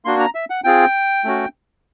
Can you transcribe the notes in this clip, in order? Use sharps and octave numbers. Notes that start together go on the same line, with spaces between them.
A#3 D4 F#4 C6
A#5
E5
F#5
C4 F4 G#4 G5
A3 C#4 F#4